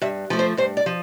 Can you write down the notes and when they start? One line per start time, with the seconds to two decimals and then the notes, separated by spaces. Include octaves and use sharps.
0.02 G2 E5
0.30 F3 A3
0.39 C5
0.57 G2 C5
0.77 D5
0.86 F3